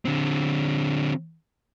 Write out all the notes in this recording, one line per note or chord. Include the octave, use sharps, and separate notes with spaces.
D3 C4